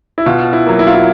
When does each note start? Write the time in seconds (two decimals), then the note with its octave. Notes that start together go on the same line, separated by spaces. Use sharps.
0.18 E4
0.26 B2 F4
0.53 E4
0.66 F#3 A#3
0.79 E4
0.87 F4
0.94 E4